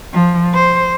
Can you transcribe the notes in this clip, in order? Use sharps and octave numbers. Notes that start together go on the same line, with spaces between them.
F3
C5